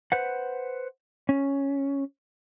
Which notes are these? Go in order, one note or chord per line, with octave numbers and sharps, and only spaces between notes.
B4 C5 F#5
C#4